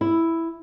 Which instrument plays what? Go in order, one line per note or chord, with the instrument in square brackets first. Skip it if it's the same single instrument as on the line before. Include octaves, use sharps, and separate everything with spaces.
[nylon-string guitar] E4